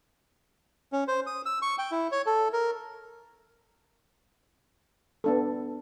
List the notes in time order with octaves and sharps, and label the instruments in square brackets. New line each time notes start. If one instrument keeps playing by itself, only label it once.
[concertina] C#4
C5
D#6
E6
C#6
G5
E4
C#5
A4
A#4
[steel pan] B3 D4 A4